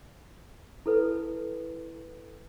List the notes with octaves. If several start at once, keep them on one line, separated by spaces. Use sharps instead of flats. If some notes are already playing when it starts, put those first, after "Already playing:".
E4 A4 B4